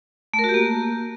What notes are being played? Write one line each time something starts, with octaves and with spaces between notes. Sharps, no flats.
A3
A#4
F#4
G4
A#3